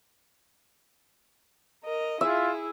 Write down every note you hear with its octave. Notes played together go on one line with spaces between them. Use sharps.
A#4 D#5
E4 F4 G#4 E5